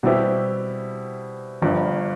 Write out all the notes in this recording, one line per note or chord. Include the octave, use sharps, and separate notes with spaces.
B2 G3 C4 E4 G4
G1 G2 F3